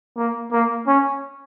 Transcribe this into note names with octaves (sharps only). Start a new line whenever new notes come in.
A#3
A#3
C#4